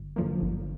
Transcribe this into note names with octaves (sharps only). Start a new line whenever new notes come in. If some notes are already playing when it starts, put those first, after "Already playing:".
Already playing: G1
F#2 D3 F3 A#3
G1